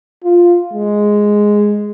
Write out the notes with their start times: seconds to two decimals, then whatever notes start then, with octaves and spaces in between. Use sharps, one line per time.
0.24 F4
0.73 G#3